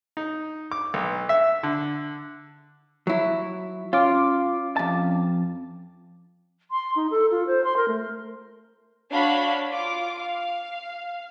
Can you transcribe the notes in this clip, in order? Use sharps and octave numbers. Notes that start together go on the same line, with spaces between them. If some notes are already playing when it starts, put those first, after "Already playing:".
D#4
D6
B1
E5
D3
F#3 E4
C#4 F4 F5 D6
F2 A5
C6
D#4
A4
F4
C5
C6
A#4
A3
D4 F#4 C#5 F5 B5
F4 D6
F5